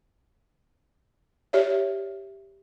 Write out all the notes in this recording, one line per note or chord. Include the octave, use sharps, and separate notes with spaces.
G4 C#5 D5 E5